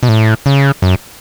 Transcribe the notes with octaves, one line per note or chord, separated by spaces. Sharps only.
B2
A2
C#3
F#2